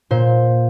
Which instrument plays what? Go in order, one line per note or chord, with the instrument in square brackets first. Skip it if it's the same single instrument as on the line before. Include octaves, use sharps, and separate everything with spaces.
[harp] A#2 C5